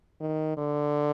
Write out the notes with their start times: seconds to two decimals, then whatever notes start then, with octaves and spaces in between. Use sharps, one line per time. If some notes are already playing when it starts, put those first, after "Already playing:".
0.21 D#3
0.57 D3